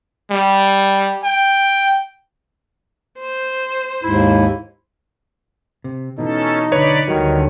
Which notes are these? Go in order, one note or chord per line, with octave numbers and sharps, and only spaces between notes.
G3
G5
C5
D#2 G#2 E4
C3
B2 E3 C#4 D#4 A4
B1 D3 B4 C#5 D5 B5
D2 D3 D#3 F#3 G3 F#4